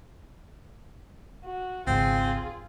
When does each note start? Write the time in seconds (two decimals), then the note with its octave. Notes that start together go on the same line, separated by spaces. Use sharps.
1.45 F#4
1.87 G#1 C#2 C4 F4 G#4